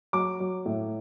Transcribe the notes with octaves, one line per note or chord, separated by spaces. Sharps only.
F#3 D6
F#3
A2